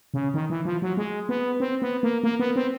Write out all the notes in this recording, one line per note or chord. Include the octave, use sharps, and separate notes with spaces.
C#3
D#3
E3
F3
F#3
G#3
B3
C4
B3
A#3
A#3
B3
C4